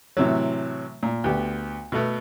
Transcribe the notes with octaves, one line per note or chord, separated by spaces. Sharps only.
A2 C3 E3 F#3
A#2
D2 B3 G4
B2 A3 B3